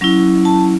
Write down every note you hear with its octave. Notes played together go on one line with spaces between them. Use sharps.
F#3 C#4 E4
A5